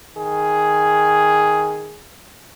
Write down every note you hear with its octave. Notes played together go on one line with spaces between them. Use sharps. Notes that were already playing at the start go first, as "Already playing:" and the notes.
D#3 G#4